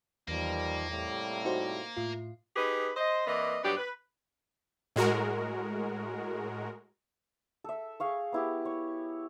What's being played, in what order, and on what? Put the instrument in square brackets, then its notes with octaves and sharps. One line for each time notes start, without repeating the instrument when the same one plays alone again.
[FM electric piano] E2 [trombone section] D#3 F3 G3 [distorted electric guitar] A#3
[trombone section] A2 C3 G3
[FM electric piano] D#4 F#4 C5
A2 F4
[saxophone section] D#4 G4 G#4 B4
C5 D#5
E3 A#3 C4 B4 D5 D#5
G2 F#3 B3 D4 G4
B4
[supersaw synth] A2 G#3 F#4 A#4
[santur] A4 E5
G#4 F5 C#6
B3 E4 G4
C#5